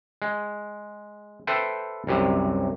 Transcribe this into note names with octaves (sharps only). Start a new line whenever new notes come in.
G#3
A4 B4 C5 E5 G5
C2 F#2 C3